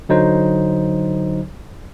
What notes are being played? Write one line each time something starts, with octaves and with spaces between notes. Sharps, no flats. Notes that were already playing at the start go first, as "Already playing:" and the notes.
D3 F#3 D#4 C5